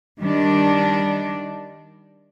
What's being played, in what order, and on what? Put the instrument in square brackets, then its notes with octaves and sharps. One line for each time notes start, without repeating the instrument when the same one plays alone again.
[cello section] D#3 G3 D4